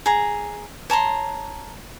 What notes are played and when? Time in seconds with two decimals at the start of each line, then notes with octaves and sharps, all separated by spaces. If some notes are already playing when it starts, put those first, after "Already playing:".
0.06 G#4 A#5
0.90 C#5 A5 A#5 C6